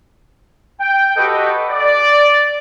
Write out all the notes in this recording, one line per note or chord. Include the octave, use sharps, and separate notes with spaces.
G5
F#4 G4 A4 B4 D#5
D5